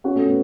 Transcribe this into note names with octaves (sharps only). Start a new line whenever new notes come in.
C#4 F#4
A3 C#4
B3